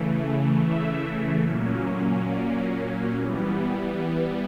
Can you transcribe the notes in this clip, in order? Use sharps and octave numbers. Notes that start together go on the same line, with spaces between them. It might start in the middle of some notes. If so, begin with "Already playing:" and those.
Already playing: C#3 E3 A3
E5
A#2 F#3 A#3 C#4
D5
E3 G3 B3